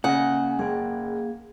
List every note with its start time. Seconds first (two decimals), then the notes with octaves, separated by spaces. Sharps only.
0.04 C#3 A#3 D#5 F#5 G#5
0.59 F#1 A#3 G#4 G5